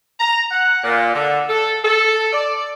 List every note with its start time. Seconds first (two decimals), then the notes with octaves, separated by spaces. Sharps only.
0.19 A#5
0.51 F#5
0.83 A#2
1.13 D3
1.49 A4
1.84 A4
2.33 D5